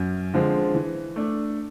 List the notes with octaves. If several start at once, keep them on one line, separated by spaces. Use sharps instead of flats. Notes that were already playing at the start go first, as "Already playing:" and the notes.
Already playing: F#2
D3 F3 G#3 C4
E3
A3 D4